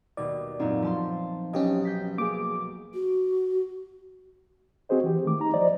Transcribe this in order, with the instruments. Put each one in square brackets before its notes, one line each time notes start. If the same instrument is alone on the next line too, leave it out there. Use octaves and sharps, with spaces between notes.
[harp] D#2 B2 [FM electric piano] D5
[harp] F#2 A#2 [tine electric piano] C4 D#4
[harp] F3 A5 C6
[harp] B1 [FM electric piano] C#4 G4 D#5
[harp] G6 B6
[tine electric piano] A#3 G#4 [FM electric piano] D6
[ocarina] F#4
[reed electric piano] C4 F#4 G#4 C5 D#5
E3 G4
D#3 A3 D6
D#4 A#5
F3 C5 D5 D#5